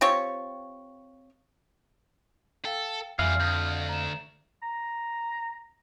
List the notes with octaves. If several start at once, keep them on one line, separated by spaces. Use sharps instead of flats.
C4 F4 G4 C#5
A4 F5 G5
F2 E3 G3 E5 F5 G#5
D2 D#6 G6
A#5 E7
A#5